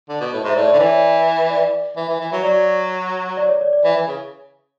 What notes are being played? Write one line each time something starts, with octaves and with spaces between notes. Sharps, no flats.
D3
B2
A2
G#2
E5
A2 D5
D5
D3
E3 C#5
D5
D5
E3
E3
E3
F#3
F#3 D5
D5
C#5
D5
D5
E3 E5
E3
C#3